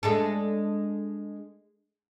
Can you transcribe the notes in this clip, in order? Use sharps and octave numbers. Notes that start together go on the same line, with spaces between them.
G#3 D4 A4